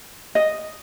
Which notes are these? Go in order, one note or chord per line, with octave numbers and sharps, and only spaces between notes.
D#5